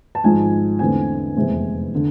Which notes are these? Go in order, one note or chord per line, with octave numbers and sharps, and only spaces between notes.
A5
G#1 G#2 F3 G#3 G#5
E2 D3 A3 C4 G#5
F1 E2 C3 G#3 C4
D3